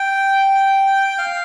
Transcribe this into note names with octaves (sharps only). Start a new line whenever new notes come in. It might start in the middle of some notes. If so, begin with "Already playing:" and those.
Already playing: G5
F5